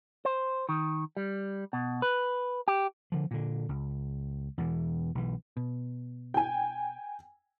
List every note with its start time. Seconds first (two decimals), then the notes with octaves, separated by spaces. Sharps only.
0.25 C5
0.69 D#3
1.17 G3
1.73 B2
2.02 B4
2.68 G4
3.12 D3 F3
3.31 A#2 D3
3.69 C#2
4.58 E2 B2 E3
5.15 B1 E3
5.57 B2
6.34 G5 G#5